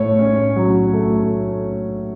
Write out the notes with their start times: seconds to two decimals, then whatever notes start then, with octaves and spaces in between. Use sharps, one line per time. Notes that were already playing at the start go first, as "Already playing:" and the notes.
Already playing: A2 C#5
0.19 C#4
0.56 F#3
0.93 A3